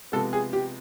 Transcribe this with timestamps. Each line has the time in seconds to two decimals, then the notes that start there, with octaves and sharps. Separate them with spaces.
0.12 C3 F3 G#3 B3 A4
0.33 G#4
0.53 G4